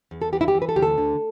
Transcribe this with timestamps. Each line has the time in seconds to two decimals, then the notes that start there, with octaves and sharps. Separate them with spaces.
0.11 E2
0.22 A4
0.33 E3 G4
0.41 E4
0.48 G4
0.54 E3
0.62 B4
0.69 A4
0.76 D2 G4
0.82 A4
0.98 D3